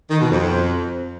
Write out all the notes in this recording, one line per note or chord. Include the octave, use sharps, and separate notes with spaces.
D#3
B2
F2